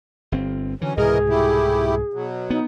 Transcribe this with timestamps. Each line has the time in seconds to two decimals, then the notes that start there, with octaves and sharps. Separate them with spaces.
0.32 G1 C4
0.81 D3 E3 F#3 C#4
0.97 C2 G#2 B2 E3 G#4 A#4 D#5
1.29 A3 E4 G4
2.13 B2 F#3
2.50 B3 D#4